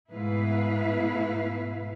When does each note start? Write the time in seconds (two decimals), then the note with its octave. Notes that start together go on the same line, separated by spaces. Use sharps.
0.10 G#2 B2 A3 E4 B4 F5